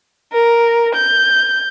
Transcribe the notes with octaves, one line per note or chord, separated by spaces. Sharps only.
A#4
G6